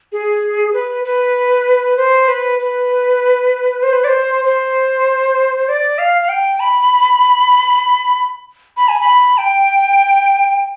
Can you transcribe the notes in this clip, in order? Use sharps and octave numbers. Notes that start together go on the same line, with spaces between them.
G#4
B4
B4
C5
B4
B4
C5
B4
D5
C5
C5
D5
F5
F5
G5
B5
B5
G#5
B5
G5